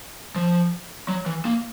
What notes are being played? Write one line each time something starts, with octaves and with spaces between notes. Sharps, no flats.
F3
F#3
E3
A#3